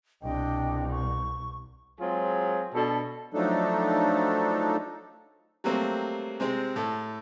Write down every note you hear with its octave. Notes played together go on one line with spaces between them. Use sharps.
C2 B2 D4 D#5 G5
C#6
F#3 G#3 C4 F4 G#4
B2 D4 A4
F3 F#3 A3 D4 D#4 A4
F#3 G3 A3 A#3 C4
C3 G#3 C4
A2 A4